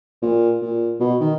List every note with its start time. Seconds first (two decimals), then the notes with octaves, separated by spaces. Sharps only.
0.22 A#2
0.62 A#2
1.00 B2
1.20 D#3